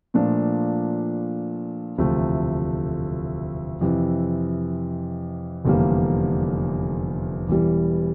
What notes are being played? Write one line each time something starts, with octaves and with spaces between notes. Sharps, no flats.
A#2 F3 A3 D4
E1 D2 C3 F3 A3
F2 C3 E3
F1 E2 D3 G3 A#3
E1 E2 E3 G3